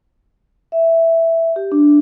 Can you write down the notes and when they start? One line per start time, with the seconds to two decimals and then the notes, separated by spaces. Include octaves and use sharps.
0.72 E5
1.56 G4
1.72 D4